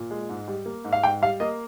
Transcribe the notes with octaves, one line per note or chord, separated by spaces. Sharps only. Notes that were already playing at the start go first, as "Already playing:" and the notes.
Already playing: A#2
G#3
G#2
G3
A#3
G#2
F5
G#2 G5
G3 F5
A#3 D#5